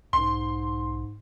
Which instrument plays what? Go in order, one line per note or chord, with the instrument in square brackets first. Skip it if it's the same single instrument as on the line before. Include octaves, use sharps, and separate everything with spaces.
[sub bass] B1 [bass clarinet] G#2 [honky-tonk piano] C6